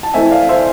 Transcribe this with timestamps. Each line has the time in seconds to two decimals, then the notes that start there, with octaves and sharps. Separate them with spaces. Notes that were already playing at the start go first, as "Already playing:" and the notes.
0.03 A5
0.14 E3 A3 C4 E5 G#5
0.31 D5 F5
0.49 C5 E5